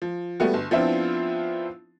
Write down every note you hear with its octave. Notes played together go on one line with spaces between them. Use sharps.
F3
G3 A3 B3 F#4
G1
F3 B3 C4 D4 E4 F4